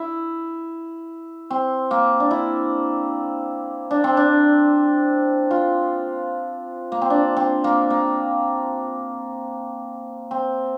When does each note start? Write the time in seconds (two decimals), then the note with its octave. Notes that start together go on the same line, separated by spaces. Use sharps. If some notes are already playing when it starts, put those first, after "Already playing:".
Already playing: E4
1.50 C4
1.91 A#3
2.20 D4
2.31 E4
3.91 D4
4.04 C4
4.17 D4
5.51 F4
6.92 A#3
7.02 C4
7.10 D4
7.37 C4
7.64 A#3
7.90 A#3
10.31 C4